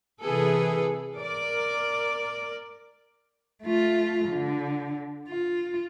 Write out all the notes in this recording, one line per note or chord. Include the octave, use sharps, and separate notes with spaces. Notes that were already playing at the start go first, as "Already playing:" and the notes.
C3 E3 G#4 A4 B4
A#4 D5
A3 F4
D3
F4